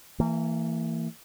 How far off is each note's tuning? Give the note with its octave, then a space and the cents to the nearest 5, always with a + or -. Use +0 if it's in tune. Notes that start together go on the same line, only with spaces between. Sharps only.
E3 +0 A#3 -35